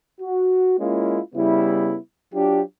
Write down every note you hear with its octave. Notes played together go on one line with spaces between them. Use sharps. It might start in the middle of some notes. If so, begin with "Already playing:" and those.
F#4
G#3 A#3 C#4 E4 F4
C#3 G3 B3 E4
F#3 D4 F4 G4